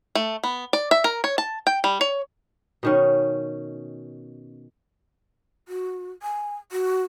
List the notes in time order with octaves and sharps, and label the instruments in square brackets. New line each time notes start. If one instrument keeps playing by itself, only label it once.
[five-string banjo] A3
B3
D5
E5
A#4
C#5
A5
G5
G3
C#5
[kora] B2 D#3 C#4
[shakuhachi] F#4
G#5
F#4